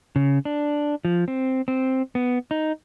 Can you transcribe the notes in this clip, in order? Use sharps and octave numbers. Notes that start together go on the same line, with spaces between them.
C#3
D4
F3
C4
C4
B3
D#4